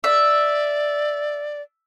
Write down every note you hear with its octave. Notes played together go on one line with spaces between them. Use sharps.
D5 E5